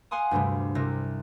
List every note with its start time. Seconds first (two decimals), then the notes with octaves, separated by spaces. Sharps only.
0.11 F5 F#5 G#5 C6 D#6
0.31 D2 G2 C3 G3
0.75 C2 C3 A#6